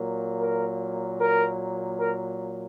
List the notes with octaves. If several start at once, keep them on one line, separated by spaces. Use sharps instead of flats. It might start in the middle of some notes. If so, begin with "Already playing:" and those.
Already playing: A#2 F#3 A#3
A#4
A#4
A#4